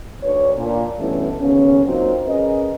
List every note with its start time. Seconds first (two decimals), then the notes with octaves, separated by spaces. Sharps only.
0.23 D2 D4 B4 C#5
0.57 A#2 D4
0.98 G2 B2 E3 A3 C#4 E4
1.40 D#2 C#3 B3 C#4
1.87 F#3 A#3 C4 D#4 F4 C5
2.27 C#4 G#4 A#4 B4 D#5